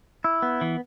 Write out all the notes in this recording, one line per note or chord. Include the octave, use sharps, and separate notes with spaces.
E4
B3
E3